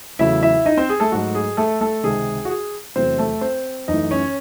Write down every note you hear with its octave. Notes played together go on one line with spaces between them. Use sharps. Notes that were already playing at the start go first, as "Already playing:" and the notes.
E2 C#3 F#3 A3 E4 E5
E4 E5
D#4 D#5
C4 C5
G#4
A3 A4
G#2 F#3 A3 F#4
G#4
A3 A4
A3 A4
C#2 C3 D#3 G#3 G#4
F#4
G#4
E2 C3 F#3 A3 C4 C5
A3 A4
C4 C5
F#2 E3 A3 D#4 D#5
C#4 C#5